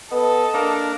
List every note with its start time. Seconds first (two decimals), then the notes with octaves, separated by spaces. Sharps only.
0.12 B3 A4 D#5
0.54 A#3 D4 A#4